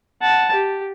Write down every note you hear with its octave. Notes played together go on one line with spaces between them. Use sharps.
F#5 A5
G4